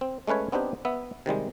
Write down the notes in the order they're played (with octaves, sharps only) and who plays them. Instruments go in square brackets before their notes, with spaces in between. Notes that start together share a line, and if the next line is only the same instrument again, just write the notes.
[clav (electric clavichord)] C4
G#3 A3 C#4 B4 C#5
B3 C4 D4 D#4 G4
B3 E5
C3 D#3 G3 G#3